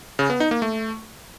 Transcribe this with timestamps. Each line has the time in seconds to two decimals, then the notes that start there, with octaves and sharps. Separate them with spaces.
0.19 C#3
0.30 B3
0.40 D#4
0.51 A#3
0.62 A3